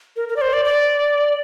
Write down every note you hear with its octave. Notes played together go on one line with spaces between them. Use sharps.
A#4
A#4
D5
C5
D5
D5